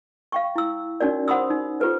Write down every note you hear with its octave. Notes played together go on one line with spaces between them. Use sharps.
F5 G5 C#6
E4 E6
C#4 D#4 F#4 A#4 C#5 D5
C5 F#5 B5 C6 D#6 E6
D#4
F4 G4 A4 B4 C5